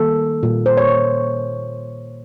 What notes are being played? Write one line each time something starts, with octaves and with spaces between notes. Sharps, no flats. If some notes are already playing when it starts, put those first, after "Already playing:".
Already playing: D#3 G3 A#3 A4
A#2 G3 A#3
C5
C#5